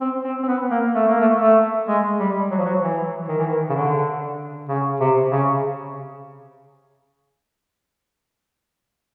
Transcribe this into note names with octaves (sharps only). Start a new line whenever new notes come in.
C4
C4
C4
B3
A#3
A3
A#3
A3
A3
G#3
G3
F#3
F3
F#3
E3
D#3
E3
D#3
C#3
D3
C#3
C3
C#3